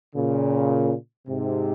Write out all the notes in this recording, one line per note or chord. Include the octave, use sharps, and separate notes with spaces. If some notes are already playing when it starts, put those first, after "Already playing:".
A#2 C#3
G#2 C3